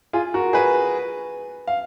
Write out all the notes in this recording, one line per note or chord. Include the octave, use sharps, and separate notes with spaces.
F4 G#4
F#4 A#4
G#4 B4
F5